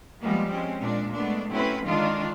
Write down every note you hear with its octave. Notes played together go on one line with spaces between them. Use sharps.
F3 G3 G#3 A#3 B3
G#3 C4 C#4
A#2 G#3 D4
G#3 A3 B3 D4
F#3 A3 C4 C#4 E4 B4
D3 D#3 G#3 D4 D#4 F4